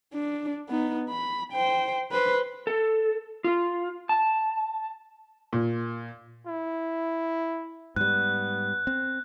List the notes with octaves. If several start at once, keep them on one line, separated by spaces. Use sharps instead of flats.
D4
B3 D#4
B5
C5 G5
B4 C5
A4
F4
A5
A#2
E4
G#2 G3 B3 F#6
C4